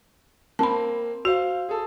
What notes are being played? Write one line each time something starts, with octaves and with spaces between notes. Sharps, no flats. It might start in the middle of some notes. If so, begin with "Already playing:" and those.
A#3 C4 A5 B5
F#4 C5 F5
G#4 A4